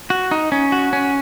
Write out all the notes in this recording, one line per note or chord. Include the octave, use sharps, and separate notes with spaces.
F#4
D#4
C#4
F#4
C#4